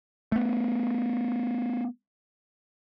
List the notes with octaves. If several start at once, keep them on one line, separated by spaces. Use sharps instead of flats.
A3 B3